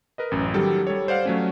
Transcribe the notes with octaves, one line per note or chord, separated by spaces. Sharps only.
A#4 B4 D#5
A1 F#2
D#3 F#3 G3 G4 A4
G3 A4 C#5
C5 D5 F5 F#5
F#3 A3 C#4